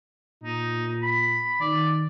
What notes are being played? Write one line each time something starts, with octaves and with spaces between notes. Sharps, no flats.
A#2 D#4
B5
D#3 D5